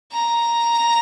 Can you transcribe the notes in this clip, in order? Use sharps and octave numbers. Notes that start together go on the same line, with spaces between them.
A#5